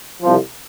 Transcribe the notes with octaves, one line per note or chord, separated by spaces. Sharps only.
C2 C3 F3